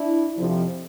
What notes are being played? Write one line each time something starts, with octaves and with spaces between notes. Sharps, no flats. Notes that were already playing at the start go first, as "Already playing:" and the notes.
Already playing: D4 E4
F2 C3 F3